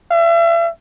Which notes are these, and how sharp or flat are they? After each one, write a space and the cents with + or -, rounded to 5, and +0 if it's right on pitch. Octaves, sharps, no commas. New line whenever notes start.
E5 +40